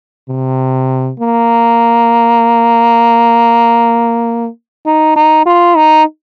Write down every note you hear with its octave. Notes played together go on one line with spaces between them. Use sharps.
C3
A#3
D#4
D#4
F4
D#4